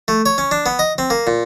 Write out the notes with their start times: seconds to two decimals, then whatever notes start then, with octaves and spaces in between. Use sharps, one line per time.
0.08 A3
0.26 C#5
0.38 C#4
0.51 D4
0.66 B3
0.79 D#5
0.98 C4
1.10 A#3
1.27 A#2